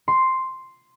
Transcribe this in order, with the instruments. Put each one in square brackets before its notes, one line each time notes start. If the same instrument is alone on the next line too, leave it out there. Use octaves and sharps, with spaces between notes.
[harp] C6